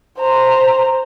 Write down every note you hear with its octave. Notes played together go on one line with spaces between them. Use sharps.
C5 A#5